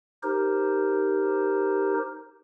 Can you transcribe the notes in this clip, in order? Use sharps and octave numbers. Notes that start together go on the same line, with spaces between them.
D#4 G4 A#4 C5